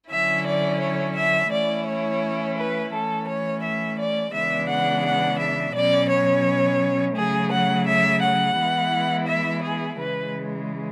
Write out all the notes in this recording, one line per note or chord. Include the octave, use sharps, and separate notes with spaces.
D3 F#3 C#4 E4 E5
D5
C#5
E5
E3 A3 C#4 E4 D5
C#5
B4
E3 A3 C#4 A4
C#5
E5
D5
C#3 E3 G#3 B3 D4 E5
F#5
F#5
E5
B2 F#3 C#4 D5
C#5
C#3 F#3 A3 G#4
F#5
E5
F#5
E3 G#3 B3 E4
E5
G#4
C#3 E3 G#3 B4